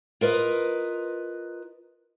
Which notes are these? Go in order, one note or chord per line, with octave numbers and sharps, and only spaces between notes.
F4 A#4 B4 D#5